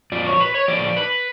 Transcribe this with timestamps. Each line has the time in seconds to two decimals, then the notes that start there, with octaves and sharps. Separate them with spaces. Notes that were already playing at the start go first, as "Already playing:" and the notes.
0.12 F2 F3 D5
0.26 C#5
0.40 B4
0.54 C#5
0.68 A2 F3 D5
0.97 B4